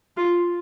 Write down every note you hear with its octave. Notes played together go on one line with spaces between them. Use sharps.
F4